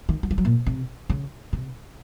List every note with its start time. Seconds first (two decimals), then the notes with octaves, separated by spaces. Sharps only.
0.09 D#3
0.23 F#3
0.31 F3
0.38 F#3
0.45 A#2
0.67 C3
1.10 C#3
1.53 C3